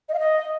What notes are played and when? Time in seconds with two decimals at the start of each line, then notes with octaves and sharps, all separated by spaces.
0.09 D#5
0.14 F5
0.19 D#5